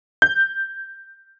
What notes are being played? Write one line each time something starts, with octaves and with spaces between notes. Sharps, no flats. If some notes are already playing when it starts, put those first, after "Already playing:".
G6